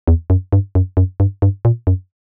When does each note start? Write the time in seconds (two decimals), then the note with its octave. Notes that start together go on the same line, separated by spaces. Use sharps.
0.07 E2
0.30 F#2
0.52 G2
0.75 F#2
0.97 F#2
1.20 G2
1.42 G2
1.65 A#2
1.87 F#2